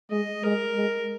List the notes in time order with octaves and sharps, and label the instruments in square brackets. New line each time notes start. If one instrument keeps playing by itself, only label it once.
[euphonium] G#3 [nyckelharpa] D#5
[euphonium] G#3 [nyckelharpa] A#4
[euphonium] G#3